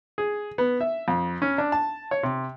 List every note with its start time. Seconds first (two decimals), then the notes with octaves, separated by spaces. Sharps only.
0.18 G#4
0.58 B3
0.81 E5
1.08 F2
1.42 C#4
1.58 D4
1.72 A5
2.11 C#5
2.23 C3